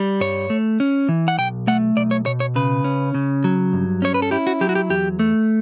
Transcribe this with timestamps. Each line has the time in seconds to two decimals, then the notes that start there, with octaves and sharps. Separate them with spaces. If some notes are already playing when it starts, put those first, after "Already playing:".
Already playing: G3
0.20 G2 C#5
0.50 A3
0.80 C#4
1.09 E3
1.28 F#5
1.38 B1 G5
1.67 A3 F#5
1.97 B1 D5
2.11 C#5
2.26 B2 C#5
2.40 C#5
2.56 C#3 B4
2.84 C#4
3.15 C#3
3.44 F#3
3.73 G2
4.02 C#4 C#5
4.14 B4
4.22 A4
4.31 E4 G4
4.47 F#4
4.61 F#3 G4
4.69 F#4
4.75 G4
4.90 E2 G4
5.19 A3